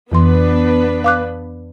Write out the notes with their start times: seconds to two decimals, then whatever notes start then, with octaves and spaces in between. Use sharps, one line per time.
0.12 F2 E3 B3 D4 B4 C6
1.04 F5 D6 F#6